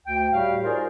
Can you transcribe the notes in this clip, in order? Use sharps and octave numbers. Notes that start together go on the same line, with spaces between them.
D2 G5
A2 G3 F#4 G4 F5
D#4 F4 G#4 A#4 C5 D5